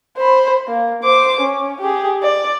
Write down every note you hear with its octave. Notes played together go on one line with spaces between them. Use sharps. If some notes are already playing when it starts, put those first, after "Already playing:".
C5 B5
A#3
C5 D6
C#4
G4 G#4
D5